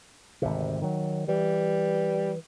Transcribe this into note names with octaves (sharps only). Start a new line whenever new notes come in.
G#1 D2 C3
D#3 F#3
E3 G3